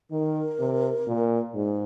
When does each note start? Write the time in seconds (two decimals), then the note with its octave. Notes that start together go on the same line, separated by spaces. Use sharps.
0.11 D#3 A#4
0.59 C3
1.07 A#2
1.55 G#2 G#4